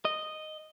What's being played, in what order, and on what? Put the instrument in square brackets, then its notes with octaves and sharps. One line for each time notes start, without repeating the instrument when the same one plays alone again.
[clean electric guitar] D#5